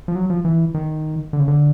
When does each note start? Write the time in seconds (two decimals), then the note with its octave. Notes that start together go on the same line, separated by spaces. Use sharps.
0.08 F3
0.16 F#3
0.30 F3
0.45 E3
0.74 D#3
1.33 D3
1.40 C#3
1.48 D3